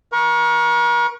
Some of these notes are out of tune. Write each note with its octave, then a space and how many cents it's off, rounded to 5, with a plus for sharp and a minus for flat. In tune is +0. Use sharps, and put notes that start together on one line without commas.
A#4 +40 C#6 +0